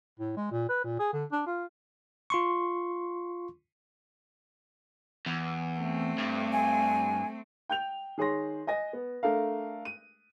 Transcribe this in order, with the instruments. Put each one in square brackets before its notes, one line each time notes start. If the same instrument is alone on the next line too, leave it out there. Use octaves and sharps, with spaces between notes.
[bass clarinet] A2
G#3
A#2
B4
A#2
G#4
D3
D4
F4
[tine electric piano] F4 C6 C#6
[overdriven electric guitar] E2
[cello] A3 C4
[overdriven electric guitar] G2
[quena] G#5
[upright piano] G5 G6 F7
D#3 G#4 C#5 C6 A#6
D#5 G#5 A#6
B3
A3 D4 A4 A#4 F5
D#7